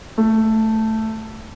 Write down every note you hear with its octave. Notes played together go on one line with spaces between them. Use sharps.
A3